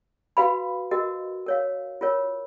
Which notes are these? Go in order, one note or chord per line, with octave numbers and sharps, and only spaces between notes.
F#4 B4 F5 B5
F#4 A#4 D#5
A#4 C#5 F5
F4 A#4 C#5